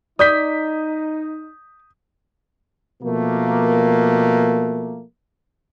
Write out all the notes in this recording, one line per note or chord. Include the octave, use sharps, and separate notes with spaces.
D#4 D5 D#6 G6 B6
B2 F3 A3 A#3